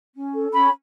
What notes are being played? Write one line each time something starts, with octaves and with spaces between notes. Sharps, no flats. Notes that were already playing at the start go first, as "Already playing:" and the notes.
C#4
A4
C#4 B5